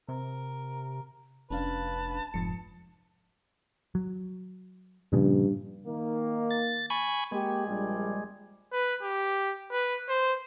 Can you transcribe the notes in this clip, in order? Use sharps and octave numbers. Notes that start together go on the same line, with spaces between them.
C3 A#4
F1 C#4 D4 B4 F5 A5
F1 G#2 F3 C#7
F#3
G2 A#2 C#3 F3
D#3 A#3
A6
G#5 B5 C#6
G#3 A#3 G4
A#1 G3
B4
G4
B4
C5